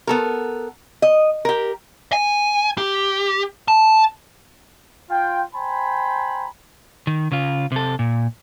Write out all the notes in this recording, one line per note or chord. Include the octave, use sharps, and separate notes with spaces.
B3 A4 A#4
D#5
G4 A#4
G#5
G4
A5
F4 G5
C5 G5 G#5 A#5 B5
D#3
C#3 F4
C3 A4
A#2